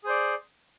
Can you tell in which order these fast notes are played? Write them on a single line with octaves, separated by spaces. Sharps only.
G#4 C5 D5